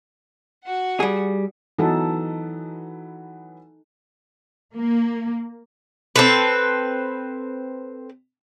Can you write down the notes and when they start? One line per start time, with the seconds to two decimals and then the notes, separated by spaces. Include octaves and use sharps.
0.64 F#4 F#5
1.00 G3 G#4
1.79 E3 F#3 B3 D#4 A4
4.75 A#3
6.16 C4 A4 B4